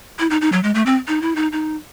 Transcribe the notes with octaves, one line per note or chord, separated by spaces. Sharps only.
E4
D#4
D#4
F#3
G#3
A3
C4
D#4
E4
D#4
D#4